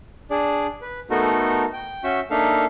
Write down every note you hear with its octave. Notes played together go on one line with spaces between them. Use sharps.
D4 G#4 D5
B4
A3 B3 D#4 F#4 A4 A#4
G5
C#4 F#4 E5 C#6 E6 G6
A#3 D4 D#4 A4 E5 F5